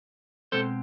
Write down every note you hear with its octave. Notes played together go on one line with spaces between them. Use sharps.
B2 G#3 C4 A4 C5